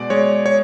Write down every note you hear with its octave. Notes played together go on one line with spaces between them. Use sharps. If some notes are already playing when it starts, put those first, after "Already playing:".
Already playing: B2 G#3 D5
G#3 C#5
C#5